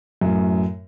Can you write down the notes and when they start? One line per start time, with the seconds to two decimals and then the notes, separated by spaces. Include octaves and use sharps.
0.21 F#2 A2